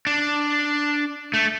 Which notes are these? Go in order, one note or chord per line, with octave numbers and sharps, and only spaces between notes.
D4
A3